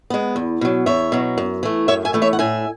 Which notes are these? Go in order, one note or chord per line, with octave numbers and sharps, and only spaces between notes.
G#3 B3
E2
B2 F#3
E2 C#5 E5
B2 F#3
F#2
E3 A3
F#2 C#5 E5
E5 G#5
E3 A3
C#5 E5
F#5
A2 E5 G#5